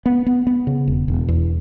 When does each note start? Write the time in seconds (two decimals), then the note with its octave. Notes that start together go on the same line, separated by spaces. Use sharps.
0.06 B3
0.26 B3
0.47 B3
0.67 C#3
0.88 E1
1.08 E1
1.28 E2